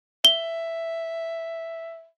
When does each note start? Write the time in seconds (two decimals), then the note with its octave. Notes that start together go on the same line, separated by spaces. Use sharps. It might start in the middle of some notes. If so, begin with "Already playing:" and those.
0.25 E5 G7